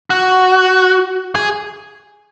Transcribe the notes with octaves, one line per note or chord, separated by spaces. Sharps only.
F#4
G#4